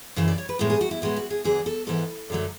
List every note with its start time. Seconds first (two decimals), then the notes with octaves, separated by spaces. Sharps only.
0.16 F#2 C#3 E3
0.28 D5
0.38 C#5
0.49 B4
0.59 A2 G#3 B3 A4
0.70 G#4
0.81 F#4
0.91 E4
1.02 A2 G#3 B3 F#4
1.16 F#4
1.30 G#4
1.44 E2 D3 F#3 G#4
1.66 A4
1.87 G#2 E3 B3 A4
2.30 F#2 D3 F#3 A3